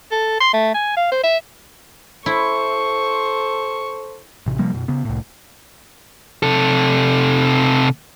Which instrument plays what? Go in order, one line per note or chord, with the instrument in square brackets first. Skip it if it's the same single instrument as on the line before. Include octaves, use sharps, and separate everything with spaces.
[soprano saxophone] A4
C6
A3
G#5
F5
C5
E5
[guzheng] E4 [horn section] A4 C5 [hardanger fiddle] C#6
[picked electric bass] A1 C3
C3 F3 G3 A#3
F#2 B2
C#3 B3
C2 A2
[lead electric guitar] C3 A4